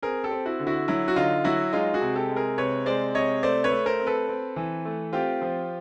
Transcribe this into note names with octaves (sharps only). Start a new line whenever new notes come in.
C4 G#4 A#4
G4 A4
C4
E4 F#4
D3
E4 F#4
F#3 E4
F#4
D3 D#4 F4
F#3 E4 F#4
G#3 D#4 F4
F#4 G#4
C3
G4 A4
G#3
G#4 A#4
C3 B4 C#5
G#3 C5 D5
C3 C#5 D#5
A3 C5 D5
B4 C#5
A3
A#4 C5
C4
A4 B4
C4
E3
A3
C4 F4 G4
F3